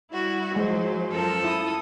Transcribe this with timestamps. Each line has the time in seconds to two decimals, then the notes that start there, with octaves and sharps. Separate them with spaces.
0.11 G3 E4 F#4
0.56 F3 F#3 G#3 C5
1.12 F#2 F3 A4 A#4
1.45 E4 D#6